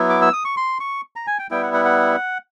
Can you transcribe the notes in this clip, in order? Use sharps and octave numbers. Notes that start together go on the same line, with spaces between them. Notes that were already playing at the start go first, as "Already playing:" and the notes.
Already playing: F#3 B3 E4
D6
E6
D#6
C#6
C6
C#6
A#5
G#5
G5
G3 B3 E4 G5
F#5
F#5
F#5